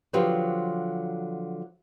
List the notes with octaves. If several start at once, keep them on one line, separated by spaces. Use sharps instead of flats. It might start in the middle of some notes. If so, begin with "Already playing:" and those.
D3 F3 F#3 G4 B4 C5